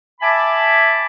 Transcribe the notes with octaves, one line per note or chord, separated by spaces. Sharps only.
E5 G#5 A5 B5 D6